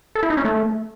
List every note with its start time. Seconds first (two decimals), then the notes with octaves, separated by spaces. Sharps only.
0.15 A4
0.23 E4
0.30 D#4
0.37 C#4
0.45 A3